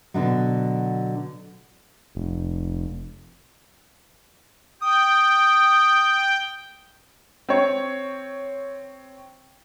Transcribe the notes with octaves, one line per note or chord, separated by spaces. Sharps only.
B2 D3 D#3 F#3
F1
G5 D#6
C4 C#5